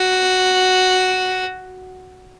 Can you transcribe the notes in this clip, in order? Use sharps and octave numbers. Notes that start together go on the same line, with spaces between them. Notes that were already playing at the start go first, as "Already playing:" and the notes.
Already playing: F#4